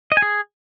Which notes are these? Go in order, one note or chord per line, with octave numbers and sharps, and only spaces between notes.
D#5
G#5
G#4